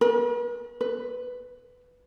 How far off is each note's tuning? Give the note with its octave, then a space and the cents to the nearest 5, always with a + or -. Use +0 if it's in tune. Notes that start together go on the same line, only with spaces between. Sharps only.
B4 -45
B4 +5